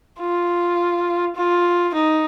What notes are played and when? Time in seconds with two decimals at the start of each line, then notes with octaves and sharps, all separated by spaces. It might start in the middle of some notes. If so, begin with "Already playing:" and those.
0.19 F4
1.36 F4
1.94 D#4